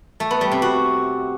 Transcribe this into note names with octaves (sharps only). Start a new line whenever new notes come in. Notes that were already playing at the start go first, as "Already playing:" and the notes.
A3
B3
G3
C3
F#4